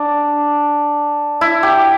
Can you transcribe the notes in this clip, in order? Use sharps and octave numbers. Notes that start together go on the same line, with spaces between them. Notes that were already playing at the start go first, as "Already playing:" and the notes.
Already playing: D4
E4
G4